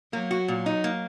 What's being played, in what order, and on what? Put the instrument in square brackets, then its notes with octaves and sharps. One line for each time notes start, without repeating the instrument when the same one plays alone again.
[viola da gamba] F#3 [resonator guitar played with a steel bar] A#3
[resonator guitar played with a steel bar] F#4
A#2
D#4
A#3